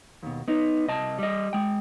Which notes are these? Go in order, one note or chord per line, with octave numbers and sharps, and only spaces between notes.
D#2 B2
B3 D#4
C2 D#5 A5
G3 D#5
G#3 G5